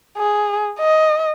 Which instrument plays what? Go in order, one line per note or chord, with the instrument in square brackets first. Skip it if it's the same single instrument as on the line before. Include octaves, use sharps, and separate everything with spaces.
[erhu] G#4
D#5